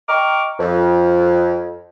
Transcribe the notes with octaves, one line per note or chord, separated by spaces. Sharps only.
D#5 G5 A#5 C#6 D6 F6
F2